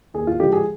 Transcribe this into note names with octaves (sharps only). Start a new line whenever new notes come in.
D#2 G#4
F4
D3 F3 G#3 G4
G#4